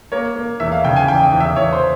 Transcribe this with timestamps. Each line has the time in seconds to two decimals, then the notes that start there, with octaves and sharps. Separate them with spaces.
0.12 A#3 C#5
0.36 A#3
0.60 E2 E5
0.72 F5
0.84 C#3 G5
0.96 G#5
1.08 E2 G5
1.24 G5
1.33 E2
1.41 E5
1.56 E2 C#5
1.73 C5